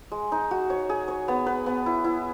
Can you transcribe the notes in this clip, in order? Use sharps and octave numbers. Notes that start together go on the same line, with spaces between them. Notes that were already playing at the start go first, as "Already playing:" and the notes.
G#3
D#4
F#4
C#5
G#4
C#5
B3
B4
B3
E4
E4